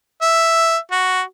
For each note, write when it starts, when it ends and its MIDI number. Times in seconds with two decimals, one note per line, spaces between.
0.22 0.77 76
0.91 1.21 66